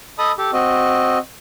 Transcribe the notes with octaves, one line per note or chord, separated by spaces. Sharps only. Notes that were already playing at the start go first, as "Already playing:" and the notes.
A4 D#5 A5 B5 D#6
G4 A4
C4 F#4 D#5